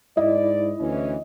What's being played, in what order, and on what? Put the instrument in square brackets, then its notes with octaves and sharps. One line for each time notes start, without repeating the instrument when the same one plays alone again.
[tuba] G#2 [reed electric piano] E4 [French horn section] D5 [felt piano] D#5
[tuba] D2 [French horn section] E3 C#4